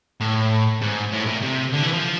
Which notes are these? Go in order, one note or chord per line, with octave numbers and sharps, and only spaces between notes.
A2
G#2
A2
A#2
C3
D3
E3
F3